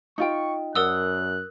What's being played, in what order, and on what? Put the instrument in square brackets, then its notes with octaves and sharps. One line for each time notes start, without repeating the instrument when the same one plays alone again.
[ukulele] D#4 F4 G5 [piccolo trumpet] C#6
[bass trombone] F#2 [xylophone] A#4 D#6 E6 [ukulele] D5 F#5 [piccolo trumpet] F#6